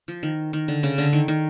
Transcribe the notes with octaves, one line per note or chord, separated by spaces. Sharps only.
F3
D#3
D#3
D3
C#3
D3
D#3
D#3